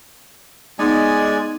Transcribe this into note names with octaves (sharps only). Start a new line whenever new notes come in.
G#3 B3 D#4 D5 G#5